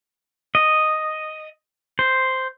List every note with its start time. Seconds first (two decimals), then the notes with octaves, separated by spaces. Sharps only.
0.55 D#5
1.99 C5